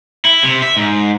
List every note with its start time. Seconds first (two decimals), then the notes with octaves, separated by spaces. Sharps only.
0.25 E4
0.43 C3
0.62 E5
0.77 G#2